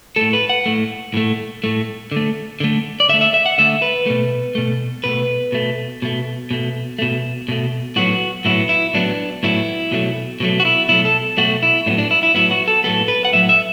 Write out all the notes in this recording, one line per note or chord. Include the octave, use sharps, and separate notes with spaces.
A2 A3 A4
B4
F#5
A2 A3
A2 A3
A2 A3
D3 A3
D3 A3
D5
D3 A3 E5
E5
E5
F#5
D3 A3 E5
B4
B2 A3
B2 A3
B2 A3 B4
B2 A3
B2 A3
B2 A3
B2 A3
B2 A3
A2 F#3 B3 F#4
A2 F#3 B3 E4
E4
A2 F#3 B3 D4
A2 F#3 B3 E4
B2 F#3 A3
B2 F#3 A3
F#4
E4
B2 F#3 A3 E4
A4
B2 F#3 A3 F#4
E4
A2 F#3 B3 D4
D4
E4
E4
A2 F#3 B3 E4
F#4
A4
A2 F#3 B3 A4
B4
F#5
A2 F#3 B3 E5
E5